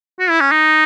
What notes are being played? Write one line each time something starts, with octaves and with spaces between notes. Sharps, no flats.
F#4
E4
C#4
D#4